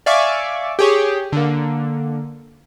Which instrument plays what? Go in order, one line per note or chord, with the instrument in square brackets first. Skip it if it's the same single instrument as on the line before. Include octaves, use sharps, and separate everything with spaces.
[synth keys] D5 E5 F5 G#5 C#6 D6
G4 G#4 C#5
D3 A#3